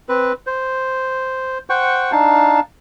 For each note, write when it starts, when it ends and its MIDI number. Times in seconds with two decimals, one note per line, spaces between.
0.09 0.33 60
0.09 0.33 71
0.47 1.58 72
1.70 2.12 72
1.70 2.12 78
1.70 2.12 79
1.70 2.12 85
2.12 2.60 62
2.12 2.60 63
2.12 2.60 77
2.12 2.60 81